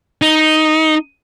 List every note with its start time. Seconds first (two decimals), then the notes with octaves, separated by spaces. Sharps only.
0.22 D#4